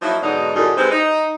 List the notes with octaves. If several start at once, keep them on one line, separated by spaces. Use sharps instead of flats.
F3 F#3 A#3 D#4 E4
G#2 B2 D3 F#3 D#4
F#2 A2 D3 G3 G#4 D#5
C3 G#3 C4 D#4 B4 C5
D#4